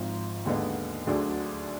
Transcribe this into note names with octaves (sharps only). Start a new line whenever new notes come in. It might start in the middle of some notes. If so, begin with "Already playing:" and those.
Already playing: G#1 G#2 F3
D#2 D3 G#3 B3 D#4
D2 D3 F#3 D4 G#4